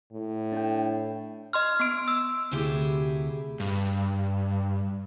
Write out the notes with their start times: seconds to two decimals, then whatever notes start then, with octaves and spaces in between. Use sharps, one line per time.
0.13 A2
0.52 D4 A4 G5
1.53 D#5 C6 F6
1.80 B3 C6 D7
2.08 E6
2.51 D2 C3 E4 G4 G#4 E5
3.60 G2